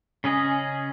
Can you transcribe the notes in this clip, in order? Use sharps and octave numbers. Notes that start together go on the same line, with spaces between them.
C#3 C#4 G#4 D#5